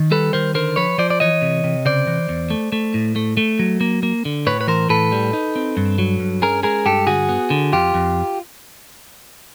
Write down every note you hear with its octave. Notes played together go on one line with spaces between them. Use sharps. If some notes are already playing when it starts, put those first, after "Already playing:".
Already playing: D#3
G3 A4 B4
D#3 A#4 C5
D3 A#4 C5
F3 B4 C#5
F3 C5 D5
D5
E3 C#5 D#5
C3
C3
C#3 C5 D5
E3
E2
A3
A3
A2
A3
A3
F#3
A#3
A#3
D3
A2 B4 C#5
B4
E3 A#4 C5
A2 A4 B4
G3
D#4
C4
G2
F#3
G2
C#4 G#4 A#4
G#3 G#4 A#4
G2 G4 A4
D3 F#4 G#4
B3
D3
F2 F4 G4
F2